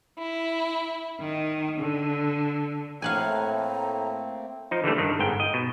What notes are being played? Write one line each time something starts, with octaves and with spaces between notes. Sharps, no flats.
E4
D#3
D3
A2 A3 A#3 C4 F5 F#5 G#5 A#5
F3 D#4
D3 E3 G3 A3
G2 D#3
G1 G#2 G5
D#5
B2